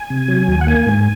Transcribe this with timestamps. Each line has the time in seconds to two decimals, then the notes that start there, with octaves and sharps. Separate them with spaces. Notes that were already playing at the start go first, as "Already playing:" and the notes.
Already playing: G#5
0.10 C3
0.28 F#3
0.48 D#2
0.61 F#5
0.67 A#3 G#5
0.87 G#2